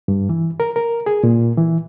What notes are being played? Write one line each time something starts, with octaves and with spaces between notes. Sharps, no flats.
G2
E3
A#4
A#4
G#4
A#2
E3